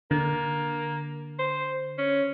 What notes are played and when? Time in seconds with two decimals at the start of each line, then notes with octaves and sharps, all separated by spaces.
0.11 D3 A#3
1.39 C5
1.98 C#4